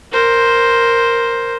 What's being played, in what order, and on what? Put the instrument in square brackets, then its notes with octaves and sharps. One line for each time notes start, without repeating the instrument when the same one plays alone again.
[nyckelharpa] A#4 C5